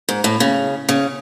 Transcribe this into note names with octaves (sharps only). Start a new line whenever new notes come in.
G#2
A2
C#3
C#3